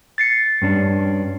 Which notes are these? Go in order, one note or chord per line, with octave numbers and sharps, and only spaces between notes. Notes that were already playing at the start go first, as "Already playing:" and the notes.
A6 C7 C#7
G2 C#4 D4